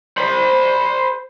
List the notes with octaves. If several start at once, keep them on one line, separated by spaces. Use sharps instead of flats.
C5 B5